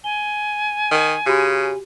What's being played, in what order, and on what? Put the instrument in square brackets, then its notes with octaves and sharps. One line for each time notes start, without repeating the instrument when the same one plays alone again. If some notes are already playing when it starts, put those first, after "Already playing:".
[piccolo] G#5 [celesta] G7
[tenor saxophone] D#3
[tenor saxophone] C#3 [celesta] F#4 G4